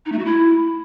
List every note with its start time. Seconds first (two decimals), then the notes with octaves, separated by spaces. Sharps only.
0.06 D#4
0.12 A3
0.19 F#4
0.25 E4